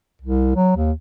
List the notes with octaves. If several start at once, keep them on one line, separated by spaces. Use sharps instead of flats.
C2
F#3
D#2